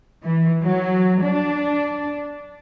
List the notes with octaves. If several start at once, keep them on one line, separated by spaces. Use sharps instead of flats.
E3
F#3
D4